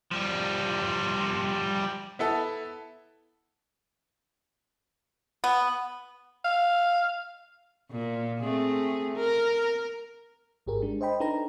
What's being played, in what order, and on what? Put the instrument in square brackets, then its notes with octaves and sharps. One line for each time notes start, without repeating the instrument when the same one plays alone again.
[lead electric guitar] F3 G3
[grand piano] B3 E4 A4
[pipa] B3
[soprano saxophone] F5
[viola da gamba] A#2
A3 C4 G#4
A#4
[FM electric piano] G#1 G#2 G4 G#4 A#4
G#3 D4
C5 D#5 G5 B5
D4 D#4 A4 B4 A#5